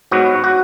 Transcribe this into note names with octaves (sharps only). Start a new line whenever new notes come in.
G#2 F#3 B3 F#4
F#4